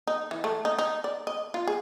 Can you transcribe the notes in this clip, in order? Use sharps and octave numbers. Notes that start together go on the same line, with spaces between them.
D#4
E3
A3
D#4
D#4
D5
D#5
F4
G#4